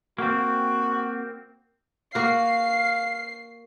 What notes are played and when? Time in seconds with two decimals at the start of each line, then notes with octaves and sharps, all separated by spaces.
0.18 A#3 C4 F#4
2.15 A#3 F#4 F5 C7